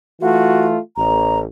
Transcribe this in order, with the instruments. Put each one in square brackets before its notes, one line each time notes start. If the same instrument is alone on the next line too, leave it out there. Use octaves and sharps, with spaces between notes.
[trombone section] E3 A3 F4 [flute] F#4
[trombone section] A1 [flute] A#5